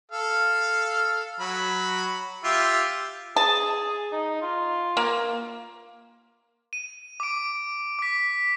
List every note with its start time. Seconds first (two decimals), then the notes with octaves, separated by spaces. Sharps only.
0.11 A4 F5
1.40 F#3 B5
2.44 F4 G4 E5
3.36 G#4 A5
4.12 D#4
4.42 F4
4.97 A#3
6.73 D#7
7.20 D6 D7
7.99 D6 B6